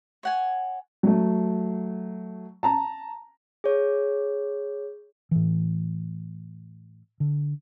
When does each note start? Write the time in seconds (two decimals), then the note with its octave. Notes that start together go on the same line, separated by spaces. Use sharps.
0.23 C#5 F#5 G#5
1.03 F#3 A3
2.63 A5 A#5
3.64 G#4 C#5
5.31 A2 E3
7.20 D3